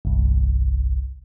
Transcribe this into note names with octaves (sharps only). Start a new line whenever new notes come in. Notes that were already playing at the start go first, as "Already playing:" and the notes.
G1 C2